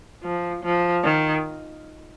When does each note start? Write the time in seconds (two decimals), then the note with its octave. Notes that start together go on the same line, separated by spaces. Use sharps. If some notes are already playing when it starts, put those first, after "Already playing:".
0.23 F3
0.64 F3
1.04 D#3